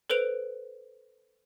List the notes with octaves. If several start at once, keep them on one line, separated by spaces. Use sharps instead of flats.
A4 B4 C5 D7 F7